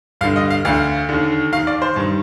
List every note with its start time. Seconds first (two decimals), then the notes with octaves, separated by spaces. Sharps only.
0.21 G2 F5
0.24 D3
0.36 D#5
0.50 F5
0.65 D2 D3 F5
1.09 D#2 D3
1.52 D#3 F5
1.56 D#2
1.67 D5
1.82 C5
1.96 G2 D#3